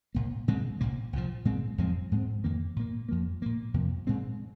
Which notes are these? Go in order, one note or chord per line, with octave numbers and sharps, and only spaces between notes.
C2 A#2 A#3
A#2 G#3 C4
C2 A#2 A#3
C2 A#2 F3
A#2 G#3 C4
F2 F3 G#3 C4
G#2 G#3 C4
F2 D#3 A#3
A#2 A#3
F2 F3 A#3
A#2 A#3
F2 C3 F3 A#3
A#2 G#3 C4